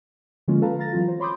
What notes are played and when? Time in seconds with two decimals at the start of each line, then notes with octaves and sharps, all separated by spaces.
0.48 D3 F3 G#3 A#3 C#4 F4
0.62 A4 B4 F5 A5 A#5
0.79 F5 A#5 A6 A#6
0.93 E3 F#3 C4 F4
1.08 C5
1.20 C#5 B5 C6 D6 D#6 G6